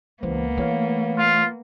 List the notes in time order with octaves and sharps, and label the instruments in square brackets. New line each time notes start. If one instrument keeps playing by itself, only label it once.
[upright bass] C#2 [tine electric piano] E3 C5 [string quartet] A#3 B3
[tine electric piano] E3 C#5 F5 [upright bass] A3
[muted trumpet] F4